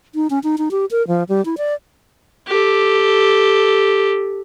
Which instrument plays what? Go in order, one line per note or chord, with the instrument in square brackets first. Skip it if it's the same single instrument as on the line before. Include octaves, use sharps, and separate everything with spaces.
[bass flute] D#4
C#4
D#4
D#4
G4
A#4
F3
G3
E4
D5
[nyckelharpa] G4 A4